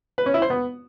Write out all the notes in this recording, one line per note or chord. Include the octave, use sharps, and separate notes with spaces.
B4
C#4
E4
C5
B3